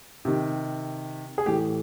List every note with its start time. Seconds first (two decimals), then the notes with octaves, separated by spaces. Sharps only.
0.25 C3 D#3
1.38 G#4
1.46 A2 E3 G4